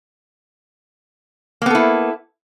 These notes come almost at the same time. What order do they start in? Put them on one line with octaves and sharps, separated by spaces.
A#3 B3 A4 E4